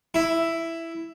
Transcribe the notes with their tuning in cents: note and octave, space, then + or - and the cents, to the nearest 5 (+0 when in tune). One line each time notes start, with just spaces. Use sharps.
E4 +5